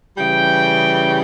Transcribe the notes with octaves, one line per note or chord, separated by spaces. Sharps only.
C#3 E3 G3 G5